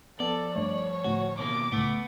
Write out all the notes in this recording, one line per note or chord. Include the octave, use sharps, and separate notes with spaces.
F3 B3 A4 D5
G2 A3 C#5
D2 A2 F#4
B2 D#3 A#3 D6
C#2 A2 A3 B3